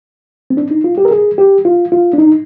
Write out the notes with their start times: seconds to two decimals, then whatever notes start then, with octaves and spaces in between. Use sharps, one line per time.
0.50 C4
0.57 D4
0.71 D#4
0.84 F4
0.98 G4
1.05 A#4
1.11 G#4
1.38 G4
1.65 F4
1.92 F4
2.13 D4
2.18 D#4